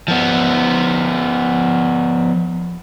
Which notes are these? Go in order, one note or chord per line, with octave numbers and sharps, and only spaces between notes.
F3 B3